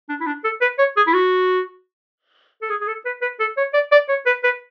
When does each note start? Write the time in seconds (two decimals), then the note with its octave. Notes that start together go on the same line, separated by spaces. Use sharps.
0.09 D4
0.21 E4
0.27 D4
0.44 A4
0.61 B4
0.79 C#5
0.97 G#4
1.07 E4
1.14 F#4
2.62 A4
2.70 G#4
2.81 G#4
2.87 A4
3.05 B4
3.22 B4
3.40 A4
3.57 C#5
3.74 D5
3.92 D5
4.09 C#5
4.26 B4
4.44 B4